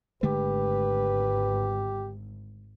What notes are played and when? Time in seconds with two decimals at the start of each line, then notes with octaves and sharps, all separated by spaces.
0.23 G#1 D3 G#3 A3 G4 B4